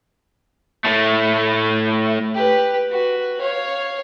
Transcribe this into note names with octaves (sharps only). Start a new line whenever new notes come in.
A2 A3
G4 B4
F#4 B4
C#5 F5